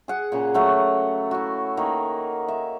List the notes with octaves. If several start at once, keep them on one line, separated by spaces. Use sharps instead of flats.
G#4 F#5
A#2 C#3
F#3 A3 F#5
E4 F#4
D#3 A#3
E5